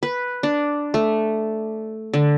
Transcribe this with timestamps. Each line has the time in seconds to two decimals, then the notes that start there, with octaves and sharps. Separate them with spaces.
0.03 B4
0.43 D4
0.94 A3
2.14 D3